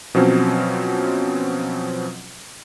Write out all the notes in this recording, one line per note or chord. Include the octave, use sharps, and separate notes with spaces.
B2 F3 F#3 C4 C#4